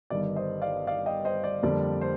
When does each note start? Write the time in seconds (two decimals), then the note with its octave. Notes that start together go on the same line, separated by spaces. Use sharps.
0.10 G1 G2 D#3 G3 D5
0.36 C5 D#5
0.62 D5 F5
0.87 D5 F5
1.06 D#5 G5
1.25 C5 D#5
1.44 D5
1.63 F2 D3 G3 A#3 D5
2.01 C5